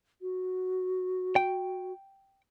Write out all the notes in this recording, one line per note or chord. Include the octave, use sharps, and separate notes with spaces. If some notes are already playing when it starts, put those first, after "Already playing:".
F#4
G5